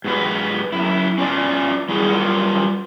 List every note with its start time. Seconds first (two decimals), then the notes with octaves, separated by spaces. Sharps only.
0.04 G#2 F#4 B4
0.72 F#2 E4
1.18 C#4 D4 F4 B4 D5 D#5
1.89 G3 E4 F#4 G#4
2.12 F#3 G3 C#4 F4 A#4